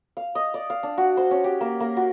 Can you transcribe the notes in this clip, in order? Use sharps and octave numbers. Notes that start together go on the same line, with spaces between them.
F5
D#5
D5
F5
D4
F#4
C5
C#4
G4
A#3
A#3
F#4